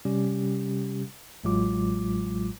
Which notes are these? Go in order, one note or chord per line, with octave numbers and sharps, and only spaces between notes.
C3 G3 C#4 G4
A1 A2 F#3 G#3 F4 D6